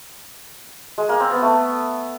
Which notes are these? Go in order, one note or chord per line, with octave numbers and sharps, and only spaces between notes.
G#3
A#3
C4
B3
A3